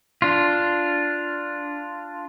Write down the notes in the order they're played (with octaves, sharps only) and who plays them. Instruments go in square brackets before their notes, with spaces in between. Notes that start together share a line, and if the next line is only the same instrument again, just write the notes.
[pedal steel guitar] D4 F4